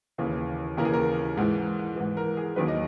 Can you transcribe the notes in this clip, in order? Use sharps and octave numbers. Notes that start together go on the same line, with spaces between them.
D#2 C#3 E3
D#2 C#3 E3 A#4
G#4
A#4
G#2 E3
G#2 E3
A#4
G#4
D#2 D#3 F#3 B4
D#5